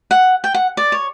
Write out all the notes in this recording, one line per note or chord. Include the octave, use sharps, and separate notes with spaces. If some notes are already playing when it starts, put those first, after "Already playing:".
F#5
G5
F#5
D5
C#5